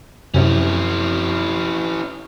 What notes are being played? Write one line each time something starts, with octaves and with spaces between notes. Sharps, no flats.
F#2 C3 C#4 E4